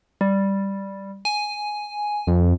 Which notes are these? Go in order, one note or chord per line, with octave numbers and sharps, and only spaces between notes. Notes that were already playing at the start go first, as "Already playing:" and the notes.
G3
G#5
F2